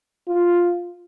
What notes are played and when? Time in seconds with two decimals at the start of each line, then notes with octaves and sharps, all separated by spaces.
0.28 F4